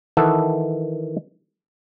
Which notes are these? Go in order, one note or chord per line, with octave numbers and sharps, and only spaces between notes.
D#3 E3 A4 E5 F#5 A5